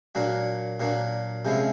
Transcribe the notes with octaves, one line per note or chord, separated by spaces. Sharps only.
A#2 F#3 A#3 D4 F#4
A#2 F#3 A#3 D4 F#4
C3 F3 G#3 C#4 E4